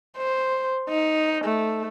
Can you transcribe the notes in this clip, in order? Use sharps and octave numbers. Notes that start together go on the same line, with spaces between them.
C5
D#4
A3